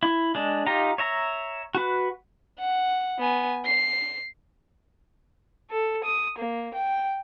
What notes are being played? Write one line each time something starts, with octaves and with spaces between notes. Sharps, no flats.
E4
G#3 D4
D#4 F4 G4 A#5
C#5 E5 A#5
F#4 B4
F#5
B3 G#5
C7
A4
D#6
A#3
G5